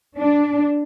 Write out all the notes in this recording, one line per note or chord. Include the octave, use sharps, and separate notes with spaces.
D4